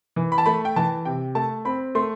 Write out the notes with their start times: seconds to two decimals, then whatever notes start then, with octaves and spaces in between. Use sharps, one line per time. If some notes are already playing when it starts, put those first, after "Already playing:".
0.16 E3
0.32 B5
0.38 A5
0.46 A3 B5
0.65 G5
0.76 E3 A5
1.05 C3 G5
1.35 A3 A5
1.65 C4 B5
1.95 A3 C6